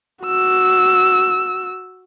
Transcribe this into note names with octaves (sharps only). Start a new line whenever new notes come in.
F#4 E6